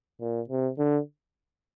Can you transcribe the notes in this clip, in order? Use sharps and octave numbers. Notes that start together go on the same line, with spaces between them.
A#2
C3
D3